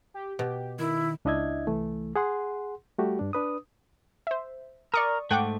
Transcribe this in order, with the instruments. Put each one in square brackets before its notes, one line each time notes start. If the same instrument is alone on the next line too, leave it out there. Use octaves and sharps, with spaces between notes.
[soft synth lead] G4
[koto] B2 [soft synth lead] G4
[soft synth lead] D#3 [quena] E4
[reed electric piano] C#2 D4 E4 D#5 E5 G#6
C2 E3 A3
G#4 F#5 C6
G3 A3 F#4 G4
G2 D4
D4 B4 D#6
[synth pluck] C5 E5
[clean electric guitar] A#4 [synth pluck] D5 C#6 D#6
[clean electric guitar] G#2 A3 [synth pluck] F#5 G5 D6